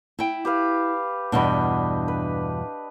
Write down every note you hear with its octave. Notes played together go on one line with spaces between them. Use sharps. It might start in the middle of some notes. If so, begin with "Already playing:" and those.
E4 G5
G4 B4 F5
E2 G2 B2 D4 D#5 B5
B4